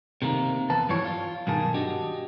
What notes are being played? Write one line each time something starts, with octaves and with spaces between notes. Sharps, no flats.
C3 D#3 G#3 A#3
E2 B4 A5
G2 E3 F3 G3 C#5
F4
B1 G2 D#3 G#4 A5
D4 F#4 G4 D#5